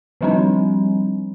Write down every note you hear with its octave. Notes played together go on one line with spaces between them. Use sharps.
D#3 F3 G3 C4 D4 D#4